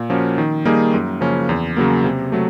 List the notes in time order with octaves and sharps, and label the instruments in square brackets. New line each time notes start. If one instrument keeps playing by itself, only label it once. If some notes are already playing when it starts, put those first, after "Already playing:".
Already playing: [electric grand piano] A#2
F3 A#3 C#4 F#4
D#3
G3 A#3 D#4 G#4
F#2
C#3 F3 A#3 C#4
E2
C#3 F#3 A#3
C3
F#3 A3